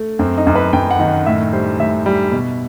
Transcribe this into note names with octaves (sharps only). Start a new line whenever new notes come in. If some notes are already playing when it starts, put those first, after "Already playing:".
Already playing: A3
F#2 C4
D#4
F#2
B4
F#2 G5
F#5
D#3
F#5
A2 E5
G3 C5
A2 E5
G3
B2